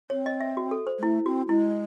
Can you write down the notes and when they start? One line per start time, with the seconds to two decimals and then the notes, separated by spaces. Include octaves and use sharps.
0.10 C4 C#5
0.26 D#5
0.41 E5
0.57 F#4
0.71 A4
0.87 C5
0.98 G#3
1.03 A3 E4
1.26 C4 F#4
1.48 G#3 E4